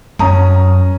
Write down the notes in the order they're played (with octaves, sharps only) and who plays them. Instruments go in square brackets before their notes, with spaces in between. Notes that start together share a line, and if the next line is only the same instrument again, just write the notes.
[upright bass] F#2 [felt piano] C#4 A#5 D#6